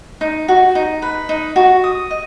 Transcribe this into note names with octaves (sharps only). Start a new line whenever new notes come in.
D#4
F#4
D#4
B4
D#4
F#4
D#6
D#5